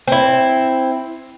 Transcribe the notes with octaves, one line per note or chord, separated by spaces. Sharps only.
C4 E4